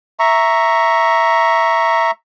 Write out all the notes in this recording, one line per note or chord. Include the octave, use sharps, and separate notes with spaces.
E5 A#5 C#6